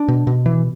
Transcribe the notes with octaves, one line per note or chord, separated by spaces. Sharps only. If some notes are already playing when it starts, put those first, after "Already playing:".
Already playing: D4
B2
B2
E3